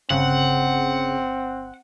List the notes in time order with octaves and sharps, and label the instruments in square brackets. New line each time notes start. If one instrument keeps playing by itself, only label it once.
[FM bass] G1 [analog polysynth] C#3 [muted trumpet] C4 [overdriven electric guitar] F#5